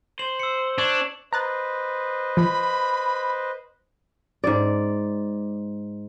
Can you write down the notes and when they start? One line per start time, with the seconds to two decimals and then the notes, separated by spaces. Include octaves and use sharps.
0.19 C5 F#7
0.40 E6 C#7
0.78 D4 C#6 G#6 E7
1.33 B4 C5 D#5 A#5 F#6 A6
2.37 F3 B5
4.44 G#2 D5